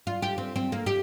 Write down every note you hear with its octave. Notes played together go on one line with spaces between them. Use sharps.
F4
G4
C4
C4
A#3
G4